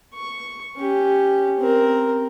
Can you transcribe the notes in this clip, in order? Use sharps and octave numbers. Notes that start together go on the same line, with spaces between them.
C#6
C#4 G4
C4 A#4